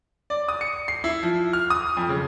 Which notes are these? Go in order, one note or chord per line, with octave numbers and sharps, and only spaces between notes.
D5
D#6
C#7
C7
E4
F3
F6
D#6
F2
C#3